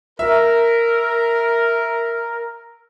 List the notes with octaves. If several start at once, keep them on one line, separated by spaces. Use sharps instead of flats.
A#4 E5